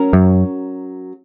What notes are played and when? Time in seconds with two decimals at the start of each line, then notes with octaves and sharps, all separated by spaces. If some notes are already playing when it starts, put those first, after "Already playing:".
Already playing: F#3 C#4 F#4 A#4
0.13 F#2